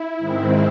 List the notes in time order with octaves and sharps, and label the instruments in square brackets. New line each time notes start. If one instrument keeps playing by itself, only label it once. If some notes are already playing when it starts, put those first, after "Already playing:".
Already playing: [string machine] E4
G#2 D#3 G#3 C4